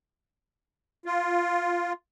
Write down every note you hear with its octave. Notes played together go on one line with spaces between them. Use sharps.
F4